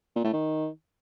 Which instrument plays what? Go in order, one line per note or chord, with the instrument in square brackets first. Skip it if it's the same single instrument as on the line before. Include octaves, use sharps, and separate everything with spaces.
[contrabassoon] A#2
A2
D#3